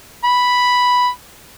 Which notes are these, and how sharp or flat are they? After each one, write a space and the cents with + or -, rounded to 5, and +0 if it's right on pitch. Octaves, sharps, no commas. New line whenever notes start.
B5 +0